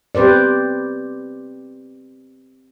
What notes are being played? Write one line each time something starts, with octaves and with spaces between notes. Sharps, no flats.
C4 G4 B4 C5 D5